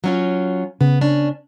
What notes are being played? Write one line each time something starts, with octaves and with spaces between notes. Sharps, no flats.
F#3 C#4 F4
C#3 B3
C#4 D4